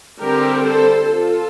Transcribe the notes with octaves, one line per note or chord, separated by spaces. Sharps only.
D3 G3 C4 G4 A#4
A4 C5
F4 A4